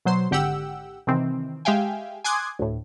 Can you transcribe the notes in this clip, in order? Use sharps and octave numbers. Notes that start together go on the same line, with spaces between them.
B2 F#3 C5 C6
G#1 D3 G4 F#5 G5 E6
C3 D#3 E3 C4
G#3 G4 E5 F5 G5 G#5
G#5 C6 D6 D#6 F#6 G#6
D2 A2